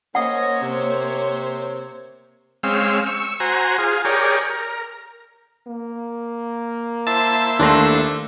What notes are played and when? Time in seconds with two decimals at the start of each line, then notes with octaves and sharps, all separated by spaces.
0.15 A#3 C#4 C5 C#5 D#5 F#5
0.62 C3
2.63 G#3 C4 C#4 F5 E6
3.06 C#6 E6
3.40 F#4 C5 G#5 A#5
3.78 F4 G#4
4.05 G4 G#4 A#4 C#5 D5
4.50 A#4
5.67 A#3
7.07 E4 C5 E5 A5
7.59 D#2 A3 D4 C6 A#6